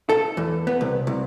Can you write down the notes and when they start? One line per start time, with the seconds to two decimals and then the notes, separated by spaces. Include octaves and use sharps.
0.09 A4
0.37 E2
0.67 B3
0.81 C2
1.07 C2